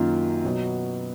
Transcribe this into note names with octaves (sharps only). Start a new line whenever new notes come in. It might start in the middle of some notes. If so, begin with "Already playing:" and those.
Already playing: F#2 D#3 A#3 F4
B2 F#3 B3